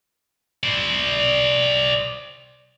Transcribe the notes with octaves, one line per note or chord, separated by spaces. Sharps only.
C5 D5